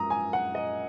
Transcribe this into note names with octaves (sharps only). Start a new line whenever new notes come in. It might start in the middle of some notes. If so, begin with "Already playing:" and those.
Already playing: F#2 F3 G#3 A#5 D#6
G#5
F#5
D#5